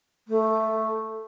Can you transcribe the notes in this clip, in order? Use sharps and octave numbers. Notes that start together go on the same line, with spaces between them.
A3